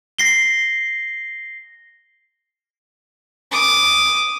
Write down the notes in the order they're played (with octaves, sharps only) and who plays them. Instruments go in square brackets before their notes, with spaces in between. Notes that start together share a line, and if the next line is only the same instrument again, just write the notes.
[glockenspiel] A#6 C7 G7
[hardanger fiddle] D6 D#6